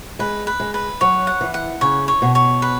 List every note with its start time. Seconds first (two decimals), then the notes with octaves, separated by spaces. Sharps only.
0.19 G#3 B4
0.47 B4
0.60 G#3
0.74 B4
1.01 F#3 C#5
1.27 F#5
1.41 E3
1.54 F#5
1.81 C#3 C#5
2.08 C#5
2.22 B2
2.35 C#5
2.62 B4